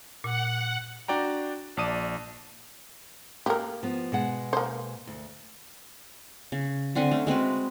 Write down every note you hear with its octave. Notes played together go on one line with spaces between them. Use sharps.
A#2 F#5
D4 F#4 D5 G5 A#5
A#1 D5 A5 D#6 D#7
A#3 G4 A#4
F3 B3
B2 G#3 F#5
A#3 C5
D2
C#3
D3 C4 F#5 G#5
A3 C#4
G#3 C4 F#4 B4